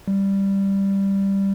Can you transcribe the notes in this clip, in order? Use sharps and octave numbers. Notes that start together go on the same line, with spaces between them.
G3